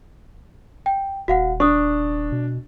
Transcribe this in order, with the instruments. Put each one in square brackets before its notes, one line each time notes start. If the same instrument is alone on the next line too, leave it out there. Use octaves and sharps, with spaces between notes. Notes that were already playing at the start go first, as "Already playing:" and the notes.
[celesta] G5
[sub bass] D#1 [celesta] F#4 F5 F#5
[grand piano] D4 [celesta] C#6 D#6
[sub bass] B2